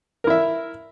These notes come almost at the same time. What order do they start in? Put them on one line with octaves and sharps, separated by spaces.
A#4 E4 E5